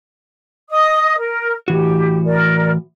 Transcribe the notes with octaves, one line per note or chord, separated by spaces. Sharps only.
D#5 D#6
A#4
A2 E3 F#4 G4
A#4 D5